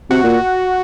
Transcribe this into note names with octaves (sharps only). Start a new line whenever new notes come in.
C3 F#4
A#2